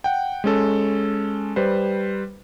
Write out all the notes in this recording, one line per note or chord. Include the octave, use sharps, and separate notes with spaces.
F#5 G5
G#3 C#4 A4
G3 B4 C5